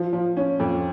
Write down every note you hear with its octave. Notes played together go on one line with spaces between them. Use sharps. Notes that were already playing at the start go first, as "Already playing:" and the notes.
Already playing: F3
F3
C#4
F2